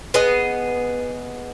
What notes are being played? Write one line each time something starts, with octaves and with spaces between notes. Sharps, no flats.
B3 G#4 D#5